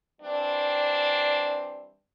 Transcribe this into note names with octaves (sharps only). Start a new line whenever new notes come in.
E3 G3 C4 D4